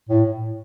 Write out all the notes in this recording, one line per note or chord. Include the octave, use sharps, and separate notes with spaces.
A2